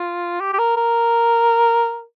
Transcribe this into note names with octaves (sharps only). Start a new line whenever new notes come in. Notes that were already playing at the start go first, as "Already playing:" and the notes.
Already playing: F4
G4
G4
A#4
A#4